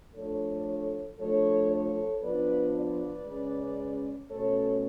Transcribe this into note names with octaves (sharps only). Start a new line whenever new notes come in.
F3 A3 D4 A4 C#5
F3 A3 D4 A4 C#5
A4 C#5
F3 B3 D4 B4 D5
B4 D5
C#3 G#3 C#4
B2 A3 C#4 A4 C#5